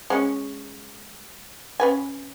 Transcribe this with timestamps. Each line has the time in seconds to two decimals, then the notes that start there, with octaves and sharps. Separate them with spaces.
0.10 G#3 C#4
1.80 C#4 B4 G#5